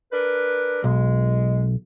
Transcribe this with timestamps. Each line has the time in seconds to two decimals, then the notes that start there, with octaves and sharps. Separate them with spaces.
0.12 D4 A#4 B4
0.84 B1 G#3